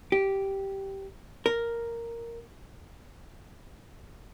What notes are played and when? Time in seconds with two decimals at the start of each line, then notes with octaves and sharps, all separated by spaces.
0.12 G4
1.46 A#4